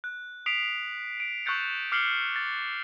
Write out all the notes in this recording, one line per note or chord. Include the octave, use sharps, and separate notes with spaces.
F#6
D#6 B6 C7 D7 F7
D7
C#6 E6 F#6 G6 A6 C#7
D6 F6 C7 C#7 F#7 G7
A6